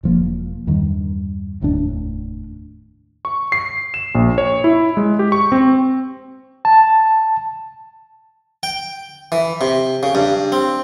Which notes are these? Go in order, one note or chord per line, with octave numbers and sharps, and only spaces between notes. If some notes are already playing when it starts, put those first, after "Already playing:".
E1 F3 A#3
E2 G2 D#3
F1 D#2 A2 D4
C#6
C7
E7
A#1
C#5
E4
G#3
G4
C#6
C4
A5
G5
E3
C3
C#3
G2
C4